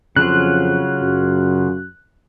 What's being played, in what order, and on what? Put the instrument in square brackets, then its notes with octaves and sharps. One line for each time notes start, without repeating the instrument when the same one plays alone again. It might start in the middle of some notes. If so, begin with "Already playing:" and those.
[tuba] F2 [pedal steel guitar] C#3 F#3 F4 [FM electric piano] F#6
[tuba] F#2